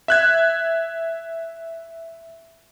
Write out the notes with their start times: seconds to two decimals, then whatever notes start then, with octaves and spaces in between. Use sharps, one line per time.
0.08 E5 F#6 G#6